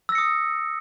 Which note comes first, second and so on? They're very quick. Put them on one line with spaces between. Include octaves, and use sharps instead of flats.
E6 A#6 C#7 D#6